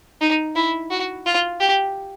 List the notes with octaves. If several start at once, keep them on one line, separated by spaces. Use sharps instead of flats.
D#4
E4
F#4
F4
G4